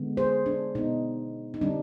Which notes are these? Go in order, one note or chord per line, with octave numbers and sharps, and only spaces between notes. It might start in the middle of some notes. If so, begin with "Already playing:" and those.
Already playing: D3 G#3 B3
G#4 C5
D4
B2 B3 D#4
D#4
D3 G3 C4 D4